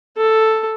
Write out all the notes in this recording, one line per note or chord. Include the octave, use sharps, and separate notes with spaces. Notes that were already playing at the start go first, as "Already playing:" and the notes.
A4